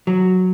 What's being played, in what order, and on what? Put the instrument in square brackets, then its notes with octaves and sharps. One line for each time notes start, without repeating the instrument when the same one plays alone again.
[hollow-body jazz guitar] F#3